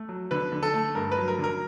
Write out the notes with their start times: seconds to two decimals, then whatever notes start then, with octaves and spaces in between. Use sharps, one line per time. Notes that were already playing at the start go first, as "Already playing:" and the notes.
Already playing: A3
0.09 F#3
0.31 D3 B4
0.52 D3
0.63 A4
0.74 A3
0.95 G2 A#4
1.12 B4
1.18 F#3
1.28 A#4
1.38 D3
1.44 A#4